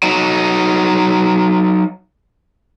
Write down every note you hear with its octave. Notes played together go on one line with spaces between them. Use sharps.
F#3 D#4